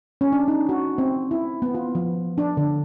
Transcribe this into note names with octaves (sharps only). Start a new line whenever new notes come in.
C#4
D4
D#4
F#4
C4
E4
B3
F4
F3
D4
D3